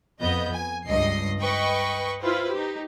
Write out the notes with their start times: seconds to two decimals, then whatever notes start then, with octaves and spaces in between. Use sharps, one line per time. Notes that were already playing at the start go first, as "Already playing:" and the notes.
0.19 F2 B3 D#5 G6
0.53 G#5
0.87 C#2 G2 D#5 C7
1.41 B4 D#5 G5 C#6
2.23 E4 F4 B4 C5
2.52 D#4 G4